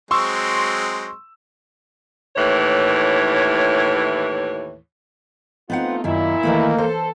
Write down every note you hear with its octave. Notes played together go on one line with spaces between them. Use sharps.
F#3 G#3 C4 C6 C#6 E6
D#2 A2 E3 C#5
A3 B3 C4 D#4 F4 F#5
F#2 A#2 D#3 E4
D#3 E3 A3 A#3
A4 C5